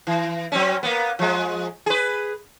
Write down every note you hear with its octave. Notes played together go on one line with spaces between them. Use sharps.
E3
F#3 C4 C#4
A#3 B3
F3 G#3
G#4 B4